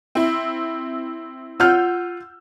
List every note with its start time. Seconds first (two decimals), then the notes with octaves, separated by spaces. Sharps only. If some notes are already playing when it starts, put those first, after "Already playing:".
0.15 C4 E4
1.60 F4 F#5 E6 F6 G6